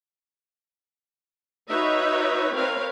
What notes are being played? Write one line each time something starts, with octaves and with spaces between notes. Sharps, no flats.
D#4 F#4 B4 C#5 D#5 E5
C4 A#4 B4 C#5 F5